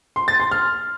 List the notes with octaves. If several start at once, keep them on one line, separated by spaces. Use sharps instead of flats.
C6
A6
C6
F6